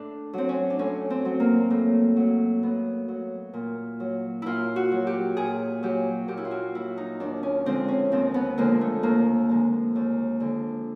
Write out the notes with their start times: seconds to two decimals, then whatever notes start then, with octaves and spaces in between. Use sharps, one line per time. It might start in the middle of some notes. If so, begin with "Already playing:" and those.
Already playing: A2 D4
0.33 F#3 C4
0.49 C#4
0.70 D4
0.79 A2 C#4
1.10 C4
1.25 F#3
1.40 A#3
1.70 A2
2.16 F#3
2.63 A2 B3
3.08 F#3
3.54 A#2
4.00 F#3
4.42 A#2 E4 F4
4.76 F#4
4.92 F#3
5.07 G4
5.37 A#2 G#4
5.83 F#3 G4
6.28 A#2 G4
6.37 E4
6.45 F4
6.51 F#4
6.75 F#3 E4
6.98 D#4
7.20 D#2 D4
7.43 C#4
7.66 D3 F3 G#3 C4
7.88 C#4
8.12 D#2 C4
8.34 B3
8.58 D3 F3 G#3 A#3
8.81 A3
9.03 D#2 A#3
9.49 D3 F3 G#3
9.96 D#2
10.40 D3 F3 G#3